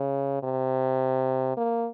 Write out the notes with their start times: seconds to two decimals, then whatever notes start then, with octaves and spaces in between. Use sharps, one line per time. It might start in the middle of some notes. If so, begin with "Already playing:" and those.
Already playing: C#3
0.43 C3
1.57 A#3